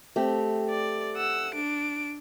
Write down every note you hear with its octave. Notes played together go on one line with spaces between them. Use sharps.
A3 C4 G4
D5
F#5 E6
D4 D7